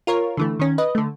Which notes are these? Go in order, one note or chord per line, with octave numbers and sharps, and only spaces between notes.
F4 A#4 C#5
D3 E3 A3
D#3 C#4
B4 D#5
D3 A3